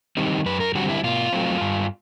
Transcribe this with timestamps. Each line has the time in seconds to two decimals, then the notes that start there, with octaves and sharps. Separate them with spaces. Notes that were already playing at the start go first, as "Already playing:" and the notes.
0.17 D#3 G3 C4 D#4
0.46 F#2 B4
0.60 A#4
0.75 D3 G3 C4 F#4
0.89 E4
1.04 B2 F4
1.33 F#3 A3 C4
1.61 G2